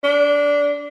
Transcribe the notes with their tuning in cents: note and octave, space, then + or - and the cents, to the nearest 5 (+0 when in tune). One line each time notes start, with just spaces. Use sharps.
D4 -15